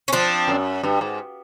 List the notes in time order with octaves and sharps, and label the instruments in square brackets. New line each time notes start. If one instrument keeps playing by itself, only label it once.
[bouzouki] C#4
[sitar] F3 [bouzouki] C4 D4
[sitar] F#2
G2
G#2